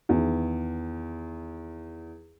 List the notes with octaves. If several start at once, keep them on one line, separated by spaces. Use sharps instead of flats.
E2 D#3